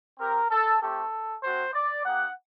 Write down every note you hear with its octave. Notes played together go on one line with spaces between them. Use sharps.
C4 G4 A#4
A4
A3 C4 G4 A4
A3 C4 F#4 C5
D5
A#3 D#4 G4 F#5